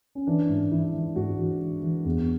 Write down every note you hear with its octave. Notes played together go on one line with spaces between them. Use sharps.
C#4
E3 D4
G#2
E3 E4
E3
G#2 F#4
E3
E3
E3
E2